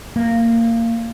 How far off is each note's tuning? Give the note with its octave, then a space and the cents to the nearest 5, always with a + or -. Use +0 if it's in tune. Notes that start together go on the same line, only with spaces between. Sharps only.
A#3 -20